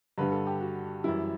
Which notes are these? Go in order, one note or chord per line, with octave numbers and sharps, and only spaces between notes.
G2 D3 G3 B4
A4
G4
F#4
F#2 E3 G3 E4